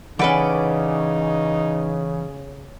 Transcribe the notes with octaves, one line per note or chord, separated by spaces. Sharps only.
C#3 E3 C#4 D#4 A4 B4 D5 F#5